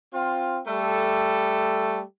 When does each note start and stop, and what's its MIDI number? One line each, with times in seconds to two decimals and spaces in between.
0.14 0.59 60
0.14 0.59 65
0.66 2.01 55
0.66 2.01 57
0.66 2.01 69